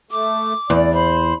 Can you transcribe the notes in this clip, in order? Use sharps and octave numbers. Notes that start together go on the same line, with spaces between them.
A3 D6
E2 D5
C5 B5